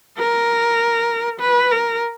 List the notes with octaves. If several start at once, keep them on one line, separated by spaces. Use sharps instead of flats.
A#4
B4
A#4